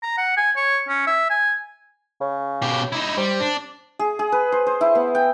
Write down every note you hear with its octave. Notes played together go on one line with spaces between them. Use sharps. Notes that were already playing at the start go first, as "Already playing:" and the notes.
A#5
F#5
G#5
C#5
C#4
E5
G#5
C#3
B2 G4
D#4 E4
G3 C5
D4
G#4
G#4
B4
C5
C5
E4
B3
G5